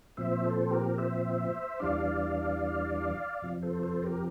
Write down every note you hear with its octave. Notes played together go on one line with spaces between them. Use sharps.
A#2 F3 C4 C5 E5
A4 C5
C5
G4 A#4
C5 E5
E2 E3 G3 D4 D5 F5
F2 C3 F3
A4 C5
A4 C5
G4 A#4